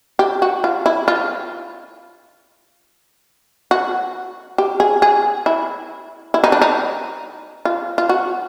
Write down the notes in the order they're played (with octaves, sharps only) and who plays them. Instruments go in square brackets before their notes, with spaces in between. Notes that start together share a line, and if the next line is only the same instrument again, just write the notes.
[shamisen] G4
F#4
F4
E4
F4
F#4
G4
G#4
G#4
E4
E4
D#4
D4
D#4
F4
F4
F#4